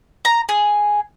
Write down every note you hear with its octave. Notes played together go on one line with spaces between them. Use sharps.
A#5
G#4